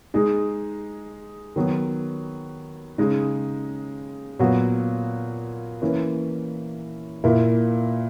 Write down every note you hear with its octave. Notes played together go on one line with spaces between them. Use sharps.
G#3 D#4 G#4
D#3 F#3 B3
C#3 G#3 D#4
A#2 F#3 B3 F#4
E3 A#3 C#4
A#2 A#3 E4